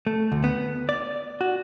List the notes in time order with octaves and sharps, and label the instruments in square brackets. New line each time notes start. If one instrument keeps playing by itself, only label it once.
[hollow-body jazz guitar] A3
D2
B3
D5
F#4